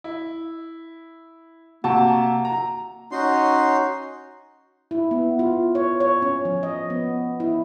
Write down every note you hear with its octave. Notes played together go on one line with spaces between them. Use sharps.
E4
C3 A#3 F#4 A5
A#5
C#4 D#4 F#4 C6
E4
B3
F4
C#5
C#5
C#4
F3
D#5
B3
E4